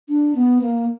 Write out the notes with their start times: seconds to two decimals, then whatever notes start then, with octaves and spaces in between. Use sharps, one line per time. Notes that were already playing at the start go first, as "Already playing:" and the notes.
0.09 D4
0.35 B3
0.61 A#3